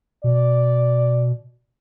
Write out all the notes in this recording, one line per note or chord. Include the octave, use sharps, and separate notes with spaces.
B2 D5